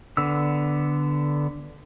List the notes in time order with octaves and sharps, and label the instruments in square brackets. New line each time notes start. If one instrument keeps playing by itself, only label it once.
[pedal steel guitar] D3 B3 E6